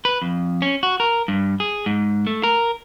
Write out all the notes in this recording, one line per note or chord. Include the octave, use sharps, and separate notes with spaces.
B4
F2
C#4
F#4
A#4
G2
G#4
G#2
A3
A#4